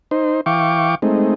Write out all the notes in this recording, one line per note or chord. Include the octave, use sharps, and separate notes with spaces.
D#4 C5
E3 F5 G5 C#6 D6
G#3 A3 C4 D#4